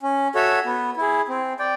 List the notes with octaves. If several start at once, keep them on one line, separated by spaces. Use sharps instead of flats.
C#4
F#4 A4 C#5 E5
B3
E4 G#4
C4
D5 G5